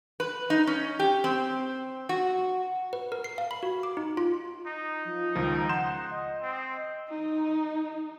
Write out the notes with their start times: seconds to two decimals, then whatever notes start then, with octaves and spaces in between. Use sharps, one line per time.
0.20 B4
0.50 D#4
0.67 C#4
0.99 G4
1.24 C4
2.09 F#4
2.93 B4
3.12 A#4
3.24 C7
3.38 F5
3.51 B5
3.63 F#4
3.83 D6
3.97 D#4
4.17 F4
4.67 D#4
5.05 F3
5.35 C#2 D#3 F3 A#5
5.69 F#5 C6 G6 E7
6.11 D#5
6.42 C4
7.09 D#4